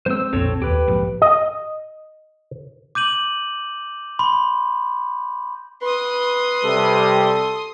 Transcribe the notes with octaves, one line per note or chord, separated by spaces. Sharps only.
G#3 A#3 C4 C5 E6
B1 F2 A#2 C4 A4 C#5
D#2 G4 B4
A#1 G#2 F3
D#5
D6 G6 D#7 F#7
B5 C6
B4 C6 D#6
C3 G3 A4